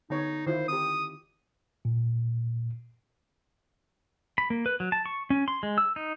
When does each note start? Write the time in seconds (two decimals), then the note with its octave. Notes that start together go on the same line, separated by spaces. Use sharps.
0.10 D3 B3 D#4 C#5
0.47 D#3 E4 F4 C5
0.68 C4 G4 D#6
1.85 A#2
4.38 B5
4.50 A#3
4.66 B4
4.80 F#3
4.92 A5
5.06 C#6
5.30 C#4
5.48 C6
5.63 G#3
5.78 E6
5.96 D#4